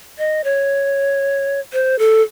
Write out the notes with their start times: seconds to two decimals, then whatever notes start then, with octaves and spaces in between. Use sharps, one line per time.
0.18 D#5
0.44 C#5
1.73 C5
1.99 A4